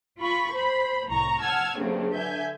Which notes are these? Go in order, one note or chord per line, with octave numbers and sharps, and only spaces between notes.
F4 B5 C#6
C5 B5
C2 A2 A#5 C#6
F#5 G#5 A5 E6 F6 G#6
G2 C#3 F#3 A3 A#3 C4
D3 E5 G#5 G6